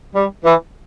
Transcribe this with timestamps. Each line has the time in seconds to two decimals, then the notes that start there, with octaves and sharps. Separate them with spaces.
0.14 G3
0.43 E3